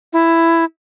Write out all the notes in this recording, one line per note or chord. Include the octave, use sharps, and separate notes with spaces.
E4